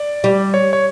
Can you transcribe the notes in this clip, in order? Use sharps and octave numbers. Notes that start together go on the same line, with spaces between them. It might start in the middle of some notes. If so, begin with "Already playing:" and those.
Already playing: D5
G3
C#5
C#5